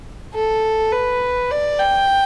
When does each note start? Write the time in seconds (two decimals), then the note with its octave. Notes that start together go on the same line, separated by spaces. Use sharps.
0.34 A4
0.92 B4
1.51 D5
1.80 G5